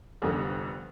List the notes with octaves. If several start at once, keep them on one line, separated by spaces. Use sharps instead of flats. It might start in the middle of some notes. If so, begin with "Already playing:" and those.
F1 F2 D3 G3 B3